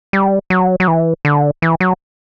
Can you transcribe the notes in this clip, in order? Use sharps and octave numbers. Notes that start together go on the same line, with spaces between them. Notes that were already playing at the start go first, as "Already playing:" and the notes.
G3
F#3
F#3
E3
D3
E3
F#3